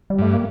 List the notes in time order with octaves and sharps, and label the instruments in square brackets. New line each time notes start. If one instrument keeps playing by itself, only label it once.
[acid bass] G3
[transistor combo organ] G2 [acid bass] A3
[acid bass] A#3